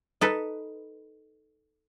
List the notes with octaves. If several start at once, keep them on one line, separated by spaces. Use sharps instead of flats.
D#4 A4 B4